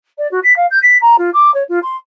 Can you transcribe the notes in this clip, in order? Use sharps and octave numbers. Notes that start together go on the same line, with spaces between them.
D5
F#4
B6
F5
G6
B6
A#5
F4
D6
C#5
F4
C6